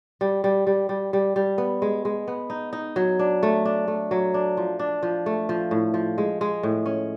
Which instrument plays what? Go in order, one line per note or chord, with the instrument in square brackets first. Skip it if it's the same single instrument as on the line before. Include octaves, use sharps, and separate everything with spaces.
[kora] G3
G3
G3
G3
G3
G3
B3
G#3
G#3
B3
D#4
D#4
F#3
D4
A3
D4
A3
F#3
D4
F3
D4
F3
A3
F3
A2
F3
G#3
G#3
A2
C#4